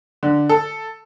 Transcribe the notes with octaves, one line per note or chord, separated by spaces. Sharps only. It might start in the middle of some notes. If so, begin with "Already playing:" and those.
D3
A4